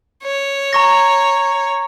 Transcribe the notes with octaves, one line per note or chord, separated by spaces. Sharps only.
C#5
A#5 C#6 A#6